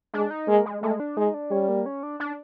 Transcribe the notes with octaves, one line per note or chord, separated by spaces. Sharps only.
G#3 D4
D#4
G#3 A#3
G#3
G#3 A3
D4
G#3 D#4
D4
G3 C#4
A#3
C#4
D4
D4